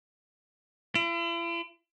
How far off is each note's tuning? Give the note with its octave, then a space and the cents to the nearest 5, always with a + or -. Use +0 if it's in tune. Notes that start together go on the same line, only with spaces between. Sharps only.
E4 +45